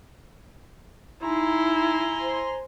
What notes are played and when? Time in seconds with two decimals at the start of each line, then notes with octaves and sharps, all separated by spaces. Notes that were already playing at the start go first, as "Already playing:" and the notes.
1.23 D#4 E4 G#5 A#5 C6
2.21 C5